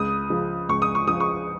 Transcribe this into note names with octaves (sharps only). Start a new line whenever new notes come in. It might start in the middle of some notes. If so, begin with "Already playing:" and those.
Already playing: C#2 D#6
C#3 F3
C#2 C#6
D#6
C#6
C#3 F3 D#6
C#6